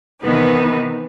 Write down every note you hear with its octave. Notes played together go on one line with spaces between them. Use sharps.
C3 D#3 E3 B3 D#4 B4